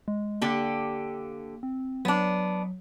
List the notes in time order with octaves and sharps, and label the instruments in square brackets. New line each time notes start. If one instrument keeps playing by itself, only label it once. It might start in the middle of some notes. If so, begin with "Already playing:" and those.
[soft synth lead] G#3
[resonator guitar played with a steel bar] D3 G4 A4 [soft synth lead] A#3
[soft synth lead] C4
[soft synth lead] F#3 [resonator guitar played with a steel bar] B3 D4